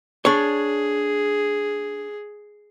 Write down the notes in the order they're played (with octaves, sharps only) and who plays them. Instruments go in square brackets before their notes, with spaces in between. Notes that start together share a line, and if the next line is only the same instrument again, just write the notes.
[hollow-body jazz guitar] D4 C#5 [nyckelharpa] G#4